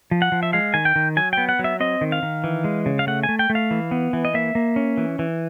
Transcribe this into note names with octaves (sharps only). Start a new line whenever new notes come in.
F3
F#5
F3
E5
G#3 F5
D#3 G#5
G5
D#3
F#3 G#5
B3 G5
F#5
F#3
E5
C4 D#5
D#3
F5
D#3
E3
G#3
C#3
F5
A3 F#5
G#5
A3
G5
A3
F5
E3
B3
E3
D#5
A#3 E5
A#3
C#4
E3
E3